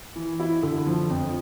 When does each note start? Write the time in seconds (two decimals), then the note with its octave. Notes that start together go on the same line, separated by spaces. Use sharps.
0.16 E3
0.40 E4
0.63 D3
0.87 F3
1.10 F2